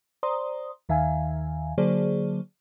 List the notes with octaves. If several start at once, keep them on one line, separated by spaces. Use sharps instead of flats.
C5 D5 A#5 C6 D#6
D#2 D#3 E5 F5 G#5
D3 F#3 A#3 G#4 C5 D5